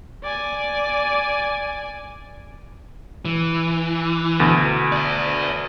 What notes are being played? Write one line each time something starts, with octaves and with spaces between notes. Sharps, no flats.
D5 G#5
E3
D2 B2
D5 E5